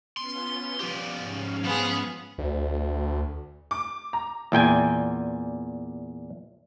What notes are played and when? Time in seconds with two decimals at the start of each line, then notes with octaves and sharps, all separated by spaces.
0.17 B3 C#4 F4 C6
0.80 F3 G4 D5
1.18 G#2 C#4 F5
1.64 F3 B3 G#4
2.38 D2
3.71 D6
4.13 A#5
4.52 E2 A#2 G5 G#5